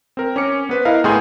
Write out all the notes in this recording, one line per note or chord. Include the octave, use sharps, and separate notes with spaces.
C4 A#4
C#4 D6 C#7
B3 B4 C5
E4 A#4 D#5 F5
A2 B3 G#4 G#5 C6 G6